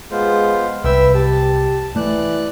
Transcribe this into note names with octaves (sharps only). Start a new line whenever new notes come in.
G#3 B3 F4 C5
C2 B4 E5 G5 E6
G4 A5
E3 A3 D5 F#6